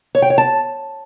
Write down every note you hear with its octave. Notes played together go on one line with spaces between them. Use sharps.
C#5
G5
C#5
A5